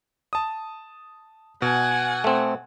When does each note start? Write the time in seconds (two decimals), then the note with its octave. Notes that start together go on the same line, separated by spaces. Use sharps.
0.33 A5 D#6
1.62 B2 F#5 G#5
2.24 A3 C4